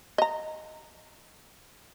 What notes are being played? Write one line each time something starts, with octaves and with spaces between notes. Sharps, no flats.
D#5 A#5